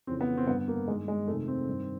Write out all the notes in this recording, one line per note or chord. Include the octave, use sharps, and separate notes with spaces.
F2 C#3 E3 C4
B3
C4
G2 D3 B3
A#3
G2 D#3 G#3
G#3
F2 C3 D#3 A3
C4
G2 D#3